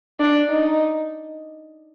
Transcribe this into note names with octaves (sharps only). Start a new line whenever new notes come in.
D4
D#4